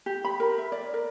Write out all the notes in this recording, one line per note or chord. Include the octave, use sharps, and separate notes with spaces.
G4
B5
A#4
E5
D5
A#4